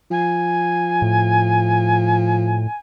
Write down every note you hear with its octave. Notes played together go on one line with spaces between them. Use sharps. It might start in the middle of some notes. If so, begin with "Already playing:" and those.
F3 G#5
A2